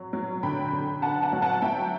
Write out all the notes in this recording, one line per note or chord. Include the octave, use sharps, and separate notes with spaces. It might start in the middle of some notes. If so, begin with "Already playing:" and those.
Already playing: F#3
F#3
D3 G5 B5
D3
D3 F#5 A5
F#5 A5
F#3
F#5 A5
F#3 E5 G5